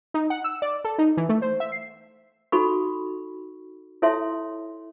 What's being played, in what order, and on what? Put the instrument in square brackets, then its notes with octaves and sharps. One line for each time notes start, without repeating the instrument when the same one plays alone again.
[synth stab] D#4
F#5
E6
D5
A4
D#4
E3
A3
C5
E5
C7
[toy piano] D#4 F#4 A4 B5 C#6
E4 A4 C#5 E5 A5 C6